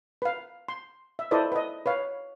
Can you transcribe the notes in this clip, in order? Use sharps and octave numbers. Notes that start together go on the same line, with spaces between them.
B4 F5
C6
E5
E4 A4 B4 C5 D5 D#5
B4 D#5
B4 C#5 F5